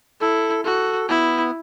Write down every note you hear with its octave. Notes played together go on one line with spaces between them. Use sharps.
E4 A4
F#4 A4
B3 E4